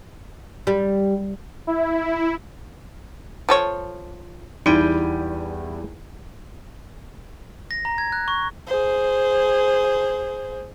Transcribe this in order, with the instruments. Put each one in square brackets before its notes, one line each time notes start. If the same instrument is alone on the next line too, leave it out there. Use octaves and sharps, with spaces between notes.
[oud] G3
[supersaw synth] E4
[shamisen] F3 A4 C#5
[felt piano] E2 E4 D#7 [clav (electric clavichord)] G3 G5 G#5 [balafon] D#4
[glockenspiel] A#6
A#5
G#6
F#6
C#6
[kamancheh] G#4 C5